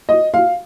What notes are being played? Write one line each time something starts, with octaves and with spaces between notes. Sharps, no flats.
D#5
F5